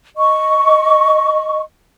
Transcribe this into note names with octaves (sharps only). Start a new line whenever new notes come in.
D#5 C#6